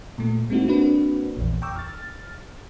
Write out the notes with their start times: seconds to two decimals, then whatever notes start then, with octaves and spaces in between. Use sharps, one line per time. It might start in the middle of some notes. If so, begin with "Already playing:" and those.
0.18 A#2 A3
0.50 G#3 A#3 C4 D#4 E4 F#4
0.68 A#3 C4 D4 F#4 B4
1.37 A#1 E2
1.62 G5 A#5 C#6 D6 E6
1.75 F6 A6